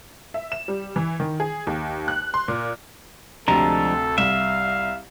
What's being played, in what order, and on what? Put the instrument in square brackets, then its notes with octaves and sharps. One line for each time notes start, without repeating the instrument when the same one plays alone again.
[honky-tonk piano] E5
E7
G3
E3
D#3
G#4
D#2
F#6
C6
A#2
[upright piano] D2 C3 [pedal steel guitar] F3 G#3 D4 [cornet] A4 [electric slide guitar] A#5
[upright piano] C2 [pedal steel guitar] E5 [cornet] F5